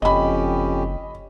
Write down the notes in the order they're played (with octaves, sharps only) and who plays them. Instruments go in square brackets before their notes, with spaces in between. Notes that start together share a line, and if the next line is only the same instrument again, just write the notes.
[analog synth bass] F#1 [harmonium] F2 C#4 G4 [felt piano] D#5 B5